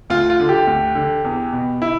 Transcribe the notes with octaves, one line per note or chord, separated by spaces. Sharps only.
D2 F4
F4
D3
G4
D2
D3
E2
B2
E4